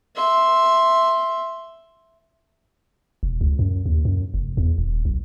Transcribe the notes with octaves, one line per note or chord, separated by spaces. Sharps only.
E5 C6
E1
C#2
F#2
D#2
F#2
F1
E2
D#1
B1